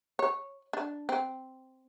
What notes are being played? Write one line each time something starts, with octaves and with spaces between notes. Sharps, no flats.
C#5
D4
C4